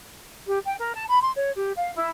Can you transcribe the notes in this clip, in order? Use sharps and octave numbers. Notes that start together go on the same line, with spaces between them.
G4
G5
A#4
A5
B5
C6
C#5
G4
F5
E4